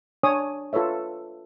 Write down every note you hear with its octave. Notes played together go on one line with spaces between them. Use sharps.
D4 C#5 G#5 D#6
F4 A4 B4 C#5 E5